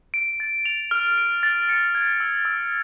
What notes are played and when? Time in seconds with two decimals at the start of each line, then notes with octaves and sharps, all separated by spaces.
0.14 D7
0.40 A6
0.65 F7
0.91 F6
1.18 D7
1.43 A6
1.69 C#7
1.95 G#6
2.20 E6
2.45 E6